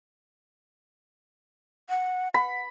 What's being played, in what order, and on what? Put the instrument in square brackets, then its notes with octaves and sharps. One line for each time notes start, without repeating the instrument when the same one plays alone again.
[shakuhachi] F#5
[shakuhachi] F#5 [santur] B5